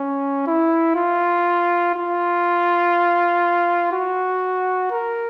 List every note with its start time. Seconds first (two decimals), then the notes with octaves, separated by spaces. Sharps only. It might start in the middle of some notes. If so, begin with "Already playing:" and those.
Already playing: C#4
0.47 E4
0.95 F4
1.95 F4
3.92 F#4
4.91 A#4